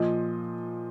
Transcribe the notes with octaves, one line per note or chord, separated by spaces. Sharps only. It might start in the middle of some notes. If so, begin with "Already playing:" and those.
Already playing: A#2 F3 D#5